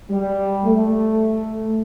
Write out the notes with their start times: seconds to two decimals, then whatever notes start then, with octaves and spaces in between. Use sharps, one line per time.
0.11 G3
0.66 A3